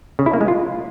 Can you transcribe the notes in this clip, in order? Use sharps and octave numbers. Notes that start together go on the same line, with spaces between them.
C#3
E4
A#3
G#3
F4